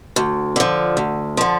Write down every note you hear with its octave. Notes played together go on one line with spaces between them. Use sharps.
D2
D3 F3
D2
D3 F3